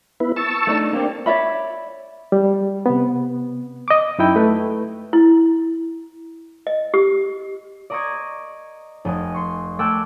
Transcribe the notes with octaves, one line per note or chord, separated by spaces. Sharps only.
B3 E4 B4
A5 C#6 E6
A3 D4 D#4
A#3 C4 D4 G4
C#5 D5 E5 B5
G3
C3 B3
D#5 D6
F#2 D#4 E4 G5
A3 B4
E4
D#5
G4
D5 D#5 A#5 C#6 D#6 G#6
F1 D#5 G#5 D#6
C6 C#6
A3 G5 G#5 D6 E6 F#6